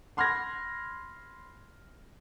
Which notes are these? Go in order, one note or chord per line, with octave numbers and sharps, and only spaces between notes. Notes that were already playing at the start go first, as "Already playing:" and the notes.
B5 C6 F6 F#6 G#6 A#6